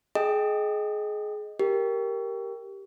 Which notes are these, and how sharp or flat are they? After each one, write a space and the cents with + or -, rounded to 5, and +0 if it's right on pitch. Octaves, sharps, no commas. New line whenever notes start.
G#4 +25 D#5 +5 G5 +0
G4 +0 A#4 +0